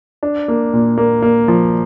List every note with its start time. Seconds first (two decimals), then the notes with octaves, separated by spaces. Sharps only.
0.23 D4
0.48 A#3
0.73 A#2
0.98 A#3
1.22 A#3
1.48 F3